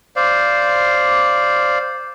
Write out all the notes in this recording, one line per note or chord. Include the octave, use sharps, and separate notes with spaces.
C5 D5 F5